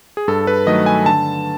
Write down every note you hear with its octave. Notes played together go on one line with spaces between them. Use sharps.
G#4
G2 A4
B4
D#3 F#3 A3 D#5
G#5
D3 A5